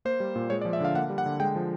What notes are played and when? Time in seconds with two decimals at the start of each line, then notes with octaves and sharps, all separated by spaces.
0.05 A#3 C5
0.20 G3
0.36 A#2
0.50 G#3 C#5
0.62 D5
0.65 F3
0.73 E5
0.81 D3 F5
0.95 A#3 F#5
1.10 G3
1.18 F#5
1.26 D3
1.40 G#3 G5
1.56 F3